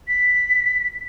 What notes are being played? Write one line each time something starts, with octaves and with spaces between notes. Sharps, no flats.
B6